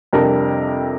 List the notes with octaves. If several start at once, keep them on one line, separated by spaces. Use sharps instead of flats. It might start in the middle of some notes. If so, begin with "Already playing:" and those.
F2 C3 G3 D4 A#4